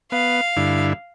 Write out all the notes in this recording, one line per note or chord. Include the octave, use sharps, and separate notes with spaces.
B3 F5
G2 D3 E4